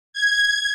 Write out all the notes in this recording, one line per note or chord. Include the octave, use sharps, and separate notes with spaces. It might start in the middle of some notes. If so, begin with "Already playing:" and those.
G#6